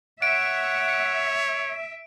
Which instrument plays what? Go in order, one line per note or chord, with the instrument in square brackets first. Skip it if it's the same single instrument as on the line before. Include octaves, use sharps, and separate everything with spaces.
[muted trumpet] C#5 [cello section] E5 [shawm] F#5 [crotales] D7